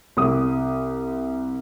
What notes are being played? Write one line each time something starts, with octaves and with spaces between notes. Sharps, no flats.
C2 D6 D#6